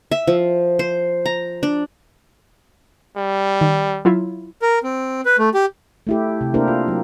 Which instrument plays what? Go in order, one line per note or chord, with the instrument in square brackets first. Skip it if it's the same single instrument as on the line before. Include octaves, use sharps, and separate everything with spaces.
[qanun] E5
F3
C5
A#5
D4
[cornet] G3
[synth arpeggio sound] D#3
F#3 E4 F4
[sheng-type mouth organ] A#4
C4
B4
A3
G4
[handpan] A3 E4 G4
C3
A#3 D4 E4 G4 A#4 C5
F4
F#3